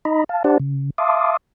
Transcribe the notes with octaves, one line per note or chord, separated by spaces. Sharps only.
D#4 D#5 A#5 B5
F5 A5
D4 G4 C5 D5 F#5 A5
C#3
E5 F5 A5 C6 D6 D#6